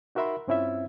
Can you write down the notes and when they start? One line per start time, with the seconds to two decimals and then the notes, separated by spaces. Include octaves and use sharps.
0.15 D#4 F#4 A#4 E5 B5 C6
0.47 G2 C4 C#4 E4 F4 E5